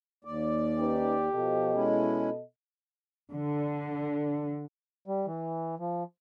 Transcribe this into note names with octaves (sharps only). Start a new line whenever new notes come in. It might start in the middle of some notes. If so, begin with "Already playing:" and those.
D#2 D5
C#4 D#4 G4 B4
B2 F3 A4 D#5
G#3 C#4 E4
D3
G3
E3
F3